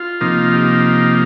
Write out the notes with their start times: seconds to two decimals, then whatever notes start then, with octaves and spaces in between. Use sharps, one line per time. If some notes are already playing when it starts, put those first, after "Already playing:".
Already playing: F4
0.21 C3 F3 A#3 D#4
0.52 D#4 G4